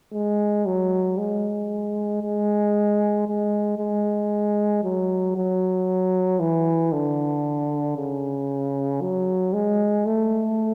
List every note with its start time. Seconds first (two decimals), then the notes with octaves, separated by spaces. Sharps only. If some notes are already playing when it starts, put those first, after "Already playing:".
0.13 G#3
0.66 F#3
1.18 G#3
2.23 G#3
3.27 G#3
3.78 G#3
4.83 F#3
5.36 F#3
6.40 E3
6.92 D3
7.97 C#3
9.01 F#3
9.53 G#3
10.06 A3